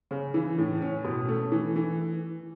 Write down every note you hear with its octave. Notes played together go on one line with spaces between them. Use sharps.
C#3
E3
A2
C#4
B2
A3
E3
E3